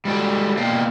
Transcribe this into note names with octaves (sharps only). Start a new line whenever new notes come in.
G3 G#3 F#4 A4 D5
B2 A#3 A#4 D5 F5 G5